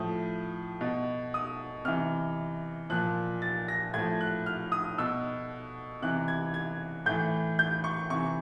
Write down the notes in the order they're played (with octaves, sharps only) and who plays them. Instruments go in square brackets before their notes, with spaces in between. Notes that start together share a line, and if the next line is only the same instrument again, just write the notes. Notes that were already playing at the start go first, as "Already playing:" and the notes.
Already playing: [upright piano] A2 F3 D#6
B2
D#6
C3 E3 F6
A#2 F3 F#6
A6
A#6
A2 F3 G#6
F#6
F6
D#6
B2 E6
C3 E3 F#6
G#6
G#6
A2 E3 G6
G6
C#6
C3 E3 C#6